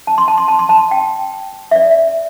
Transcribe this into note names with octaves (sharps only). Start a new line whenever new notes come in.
A5
C6
A5
C6
A5
C6
A5
G5
E5
D5